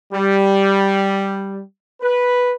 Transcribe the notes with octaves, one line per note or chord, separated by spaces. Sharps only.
G3
B4